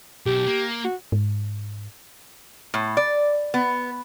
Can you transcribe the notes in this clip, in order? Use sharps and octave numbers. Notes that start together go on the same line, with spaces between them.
B1 G4
A#3
F#4
G#2
A2
D5
B3